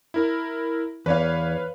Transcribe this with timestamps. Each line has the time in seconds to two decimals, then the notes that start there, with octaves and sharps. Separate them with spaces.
0.14 E4 A#4
1.06 E2 B4 C#5 F5